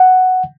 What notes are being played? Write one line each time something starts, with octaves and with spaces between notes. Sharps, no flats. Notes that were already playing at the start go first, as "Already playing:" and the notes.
Already playing: F#5